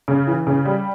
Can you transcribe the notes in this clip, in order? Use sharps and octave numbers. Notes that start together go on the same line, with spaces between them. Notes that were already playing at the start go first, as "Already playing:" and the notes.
C#3
E3
C#3
G3